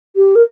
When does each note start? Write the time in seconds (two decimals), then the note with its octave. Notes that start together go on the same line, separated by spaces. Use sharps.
0.16 G4
0.35 A#4